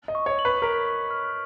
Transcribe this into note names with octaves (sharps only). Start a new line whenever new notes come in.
D#5
C#6
C#5
F#7
B4
A#4 B6
C#6
F6